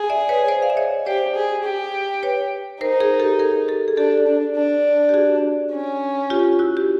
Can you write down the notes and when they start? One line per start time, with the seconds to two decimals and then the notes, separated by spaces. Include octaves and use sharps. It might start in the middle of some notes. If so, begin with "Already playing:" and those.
Already playing: G#4
0.10 D5 E5
0.29 B4 C#5
0.48 C5 D5
0.62 F5
0.70 E5
0.77 C#5 D#5
1.06 G4 C5 D5
1.35 G#4
1.64 G4
2.23 B4 C#5
2.81 D#4 A#4 C5
3.00 G#4 A#4
3.20 G4 A4
3.39 G#4 A#4
3.68 G4 A4
3.88 G#4
3.97 D4 G4 A4
4.27 D4
4.55 D4
5.09 G4
5.14 F#4 G#4
5.72 C#4
6.30 F4 G4
6.59 E4 F#4
6.77 G4